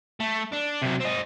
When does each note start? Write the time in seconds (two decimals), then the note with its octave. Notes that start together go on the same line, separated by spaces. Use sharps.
0.20 A3
0.53 D4
0.82 C3 F#3
1.01 C4 D#4